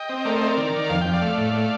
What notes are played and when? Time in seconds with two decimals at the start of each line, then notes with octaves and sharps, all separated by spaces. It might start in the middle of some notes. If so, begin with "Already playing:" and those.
Already playing: D#5 G5
0.09 C4
0.25 A3 A#4 D5
0.35 C5 D#5
0.41 C4
0.47 A#4 D5
0.57 D#3
0.73 D#3
0.89 F2 F5
1.01 F2 G5
1.13 D5 F5
1.21 A3
1.37 A2
1.53 A3